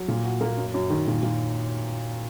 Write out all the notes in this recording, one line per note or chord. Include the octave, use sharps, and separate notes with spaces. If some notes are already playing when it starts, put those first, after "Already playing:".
Already playing: F#3
A#2
F#4
A#3
F#2
F#2
D#3
A#2
A#2